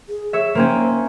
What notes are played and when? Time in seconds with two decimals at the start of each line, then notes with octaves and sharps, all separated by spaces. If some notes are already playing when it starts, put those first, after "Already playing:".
0.09 G#4
0.33 C#5 E5
0.55 A#3 C4 C#4 C5